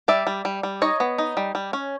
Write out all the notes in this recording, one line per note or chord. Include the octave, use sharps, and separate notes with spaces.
G3 D5 E5
G3
G3
G3
D#4 C#5 D#5
B3
D#4
G3
G3
C#4